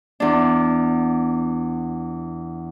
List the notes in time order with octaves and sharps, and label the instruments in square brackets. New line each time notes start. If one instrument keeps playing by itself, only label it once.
[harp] E2 D4